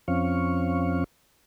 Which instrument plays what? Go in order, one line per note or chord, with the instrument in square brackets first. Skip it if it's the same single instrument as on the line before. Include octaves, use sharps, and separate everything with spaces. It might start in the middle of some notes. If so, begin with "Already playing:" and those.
[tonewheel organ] F2 F3 C4 C#4 F5 C#6